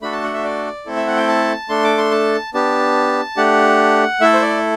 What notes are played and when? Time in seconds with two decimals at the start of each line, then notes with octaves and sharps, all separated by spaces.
0.02 A3 D4 F#4 A4 B5
0.12 A5
0.24 F#5
0.34 E5
0.44 D5
0.86 A3 C4 E4 A4
0.96 E5
1.07 F#5
1.17 G5
1.28 A5
1.69 A3 D4 A4 C6
1.84 D6
1.98 C6
2.11 A5
2.54 B3 D4 G4 A5
3.37 A3 D4 G4 F#5
4.20 A3 E4 A4 E5
4.34 C5
4.42 D5